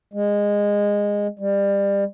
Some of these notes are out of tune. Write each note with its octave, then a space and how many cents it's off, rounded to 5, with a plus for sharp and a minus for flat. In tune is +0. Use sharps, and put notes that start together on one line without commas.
G#3 -20
G3 +25